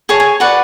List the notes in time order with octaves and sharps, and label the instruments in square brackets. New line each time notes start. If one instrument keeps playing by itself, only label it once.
[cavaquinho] G#4 C#5 A5
G#5
F#4 B4 D5 F#5